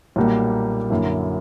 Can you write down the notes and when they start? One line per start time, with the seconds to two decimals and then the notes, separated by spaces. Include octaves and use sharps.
0.16 B1 A#2 G3 A#3
0.90 F#2 D3 A#3 E4